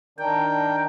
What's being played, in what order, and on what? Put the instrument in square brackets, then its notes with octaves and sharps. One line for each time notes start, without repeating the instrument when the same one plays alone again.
[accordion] D#3 D4 A#4 [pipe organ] G5